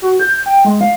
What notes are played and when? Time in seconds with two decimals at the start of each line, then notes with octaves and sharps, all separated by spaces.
0.02 F#4
0.20 G6
0.46 G5
0.65 G#3
0.81 F5